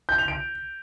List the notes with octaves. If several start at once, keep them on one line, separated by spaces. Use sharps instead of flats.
G6
F7
D7